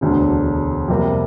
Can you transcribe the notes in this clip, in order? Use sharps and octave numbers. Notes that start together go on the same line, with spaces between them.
E1 D2 D3
F2 C3 G3 A#3